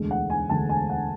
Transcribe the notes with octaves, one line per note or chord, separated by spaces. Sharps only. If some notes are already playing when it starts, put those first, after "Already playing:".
Already playing: E1 D2 D3 G#3
F#5
G#5
E1 D2 D3 G#3 A5
G#5
F#5